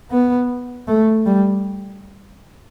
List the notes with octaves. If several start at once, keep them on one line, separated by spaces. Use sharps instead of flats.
B3
A3
G3